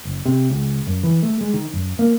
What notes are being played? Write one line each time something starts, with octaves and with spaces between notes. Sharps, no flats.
F#1
C3
C#2
F#2
E3
A3
G#3
D#3
F#2
A#3